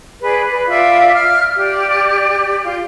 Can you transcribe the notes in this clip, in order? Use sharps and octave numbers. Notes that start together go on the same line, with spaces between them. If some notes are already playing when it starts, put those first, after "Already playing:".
G#4 B4 D5
B4
F4 D5 E5 F5
F6
G4 D5
F4